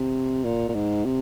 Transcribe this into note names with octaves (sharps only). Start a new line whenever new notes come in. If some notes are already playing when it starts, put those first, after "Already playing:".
Already playing: C3
A#2
A#2
G#2
C3